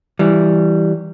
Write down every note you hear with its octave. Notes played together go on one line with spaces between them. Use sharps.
E3 G3